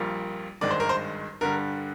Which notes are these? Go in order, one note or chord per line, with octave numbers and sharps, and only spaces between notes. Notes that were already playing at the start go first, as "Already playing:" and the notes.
Already playing: A#1 A#2 G3 A#3
G#1 G2 D#3 G#3 D5
C5
A#4
C5
G2 D3 G3 A#4